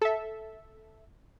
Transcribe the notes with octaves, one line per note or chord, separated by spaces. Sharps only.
A4 E5